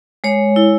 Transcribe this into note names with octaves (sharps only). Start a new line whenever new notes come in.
G#3 C#5
E4